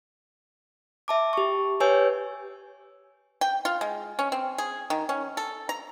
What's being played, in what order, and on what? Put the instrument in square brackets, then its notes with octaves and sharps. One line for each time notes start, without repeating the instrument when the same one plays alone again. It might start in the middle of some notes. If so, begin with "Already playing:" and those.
[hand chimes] E5 A5 D6
G4 C#6
G4 B4 C#5 G#5 E6 G6
[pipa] G5
F4
G#3
C#4
C4
G#4
D#3
C#4
A4
A#5